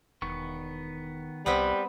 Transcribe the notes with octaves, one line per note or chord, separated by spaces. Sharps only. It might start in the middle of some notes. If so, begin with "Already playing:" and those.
E1 D#3 B3 C#6
C2 G3 B3 C4 E4 B4